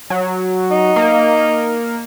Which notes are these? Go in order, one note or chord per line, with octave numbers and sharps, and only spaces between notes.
F#3
D#4
A#3